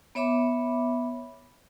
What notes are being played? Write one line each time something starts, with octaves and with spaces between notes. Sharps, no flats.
B3 C#5 E5 B5 D6